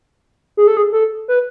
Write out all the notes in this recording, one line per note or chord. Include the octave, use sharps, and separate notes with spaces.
G#4
A4
G#4
A4
B4